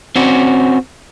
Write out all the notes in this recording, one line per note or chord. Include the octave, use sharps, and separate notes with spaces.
C4 C#4 F#4 D5